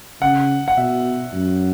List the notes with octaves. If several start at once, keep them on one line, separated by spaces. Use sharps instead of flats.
C#3 F#5
F#5
B2 E5
F#2